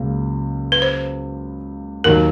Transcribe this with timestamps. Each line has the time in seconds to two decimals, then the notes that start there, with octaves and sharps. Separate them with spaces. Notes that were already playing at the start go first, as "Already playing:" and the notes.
Already playing: C#2 C#3 F#3 A#3
0.72 B4
0.82 C5
2.04 D#2 D#3 F#3 A#4